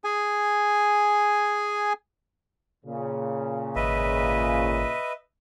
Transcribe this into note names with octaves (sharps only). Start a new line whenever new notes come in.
G#4 G#5
A#2 C#3
G#1 B4 D#5 E5